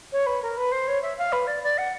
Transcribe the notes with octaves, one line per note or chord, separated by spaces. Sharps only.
C#5
B4
A#4
B4
C5
C#5
E5
F5
B4
D5
D5
F#5